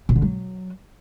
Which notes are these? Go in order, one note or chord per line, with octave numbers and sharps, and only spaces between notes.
B2
D3
F#3